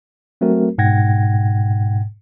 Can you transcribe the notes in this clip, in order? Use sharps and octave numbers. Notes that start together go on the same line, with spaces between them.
F#3 A3 C4 F#4 A#4
G#2 B2 F#5 G5 G#6 A#6